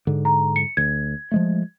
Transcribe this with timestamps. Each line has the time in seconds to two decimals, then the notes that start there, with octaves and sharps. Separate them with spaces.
0.07 G#2 D3
0.25 A#5
0.56 C#7
0.77 D2 G#6
1.31 F3 G#3 A3